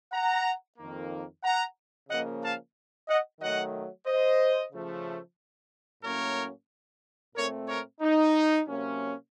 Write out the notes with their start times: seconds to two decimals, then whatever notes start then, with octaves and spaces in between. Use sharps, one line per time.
0.12 F#5 A#5
0.78 F2 D#3 A#3
1.44 F#5 A#5
2.10 C#3 F3 A#3 C#4 D#5 F#5
2.42 F5 A5
3.08 D#5 F#5
3.41 D#3 F#3 A3 D#5 F#5
4.07 C5 D#5
4.73 C#3 F3 A3
6.04 A2 F#3 A#3 C#4 A#4 C#5
7.35 A#2 A3 C4 A#4 C#5
7.68 A#4 C#5
8.01 D#4
8.67 C3 F#3 A#3 C#4